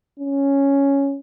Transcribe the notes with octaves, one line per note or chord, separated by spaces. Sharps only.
C#4